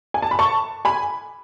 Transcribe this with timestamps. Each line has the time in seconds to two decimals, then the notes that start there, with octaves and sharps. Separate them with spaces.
0.14 G#5
0.22 A5
0.31 B5
0.39 A5 C#6
0.85 G#5 B5